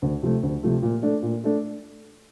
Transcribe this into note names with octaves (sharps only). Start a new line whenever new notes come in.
D2
C3 F3 A3
D2
C3 F3 A3
A#2
A3 D4 A4
A#2
A3 D4 A4